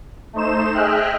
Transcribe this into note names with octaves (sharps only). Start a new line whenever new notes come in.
A3 D#4 C5 E7
G#4 D#5 E5 G5 F6 F#6